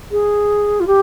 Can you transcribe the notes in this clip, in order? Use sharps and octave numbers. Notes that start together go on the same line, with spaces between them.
G#4
F4
G4